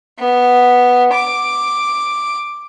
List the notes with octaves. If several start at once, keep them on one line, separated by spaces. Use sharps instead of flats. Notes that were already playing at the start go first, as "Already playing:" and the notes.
B3
D6